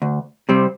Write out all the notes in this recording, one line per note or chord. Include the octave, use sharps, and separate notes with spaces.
D2
C3 G3 C4